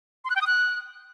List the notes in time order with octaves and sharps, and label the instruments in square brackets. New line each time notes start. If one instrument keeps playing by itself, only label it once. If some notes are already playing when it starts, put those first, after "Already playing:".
[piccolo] C6
F#6
G5
D#6
F#6